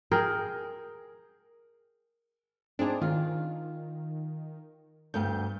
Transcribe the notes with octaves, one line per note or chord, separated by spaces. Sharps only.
G#4 A#4 G5
C4 D4 D#4 G#4
D#3 F4
D2 G2 B3 G6